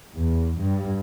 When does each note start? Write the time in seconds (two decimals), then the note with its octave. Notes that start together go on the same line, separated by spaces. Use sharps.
0.14 E2
0.61 G2